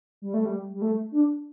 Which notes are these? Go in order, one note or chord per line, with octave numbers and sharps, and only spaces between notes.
G3
A3
G3
G3
A3
D4